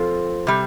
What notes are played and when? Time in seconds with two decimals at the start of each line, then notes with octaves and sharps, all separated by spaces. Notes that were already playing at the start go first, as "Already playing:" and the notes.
Already playing: F3 C4 F4 A4
0.47 C3 G3